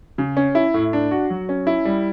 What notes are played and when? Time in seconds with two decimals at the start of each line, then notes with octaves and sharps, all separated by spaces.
0.18 C#3
0.37 C#4
0.55 E4
0.74 A2
0.93 D4
1.11 F#4
1.30 F#3
1.49 C#4
1.67 E4
1.85 G3